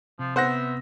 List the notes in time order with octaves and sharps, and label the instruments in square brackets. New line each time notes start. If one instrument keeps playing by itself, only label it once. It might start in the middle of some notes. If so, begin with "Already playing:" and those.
[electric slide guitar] C3 [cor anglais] F3
[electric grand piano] B3 A#6 [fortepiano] C5 F#5 [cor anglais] E5